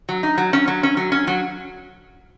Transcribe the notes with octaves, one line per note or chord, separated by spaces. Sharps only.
F#3
D#4
F#3
C#4
F#3
C#4
F#3
C#4
F#3